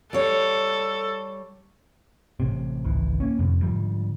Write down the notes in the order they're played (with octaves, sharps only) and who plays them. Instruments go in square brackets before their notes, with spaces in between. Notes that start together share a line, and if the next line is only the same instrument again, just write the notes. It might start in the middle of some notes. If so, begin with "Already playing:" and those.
[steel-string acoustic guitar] G3 C#5 [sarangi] A4
[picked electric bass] A1 A2 C3
G#1 C#2 E3
A#3 C#4
F2 A2 C3
G#2 D3 F3 G3